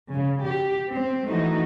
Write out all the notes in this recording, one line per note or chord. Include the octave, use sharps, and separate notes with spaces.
C#3
G4
C4
E3 A3 D#4 F#4